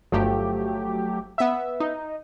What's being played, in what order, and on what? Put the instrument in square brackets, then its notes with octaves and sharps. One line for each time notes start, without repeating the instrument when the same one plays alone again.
[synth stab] G1 F3 [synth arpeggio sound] F#3 A3 G4
[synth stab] B3 E5
[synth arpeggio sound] D#4